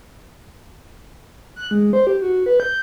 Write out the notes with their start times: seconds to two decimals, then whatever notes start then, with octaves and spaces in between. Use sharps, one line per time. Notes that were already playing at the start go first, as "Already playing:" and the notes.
1.56 F#6
1.71 G#3
1.93 C5
2.07 G4
2.22 F#4
2.46 B4
2.60 G6